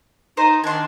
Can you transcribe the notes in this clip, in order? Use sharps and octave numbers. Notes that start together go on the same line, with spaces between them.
D#4 C5
D#3 D4 G#5 C6